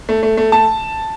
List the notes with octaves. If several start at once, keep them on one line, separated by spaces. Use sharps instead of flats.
A3
A3
A3
A3 A5